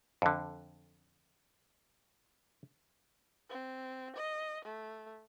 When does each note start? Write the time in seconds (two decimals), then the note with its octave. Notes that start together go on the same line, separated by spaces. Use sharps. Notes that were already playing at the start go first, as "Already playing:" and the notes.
0.22 F2 D3
3.50 C4
4.16 D#5
4.65 A3